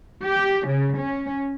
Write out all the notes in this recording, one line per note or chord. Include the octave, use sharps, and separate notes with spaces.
G4
C#3
C#4